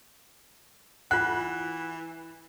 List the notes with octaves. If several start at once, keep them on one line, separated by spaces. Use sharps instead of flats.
E3 F4 F#5 F#6